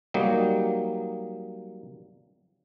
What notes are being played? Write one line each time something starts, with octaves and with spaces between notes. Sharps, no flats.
F#3 G3 A#3 D#4